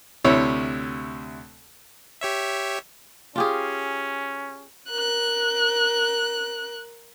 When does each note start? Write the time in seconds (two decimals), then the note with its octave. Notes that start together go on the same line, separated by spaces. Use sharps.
0.25 D2 C3 E4 C#5
2.21 G4 C#5 E5
3.36 C#4 F4 G4 G#4
4.90 A#4 F#6